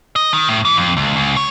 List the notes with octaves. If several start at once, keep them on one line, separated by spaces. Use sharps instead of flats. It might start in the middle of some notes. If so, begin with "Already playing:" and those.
D#5
D#3
A2
E3
F2
C#2
C#2
C#5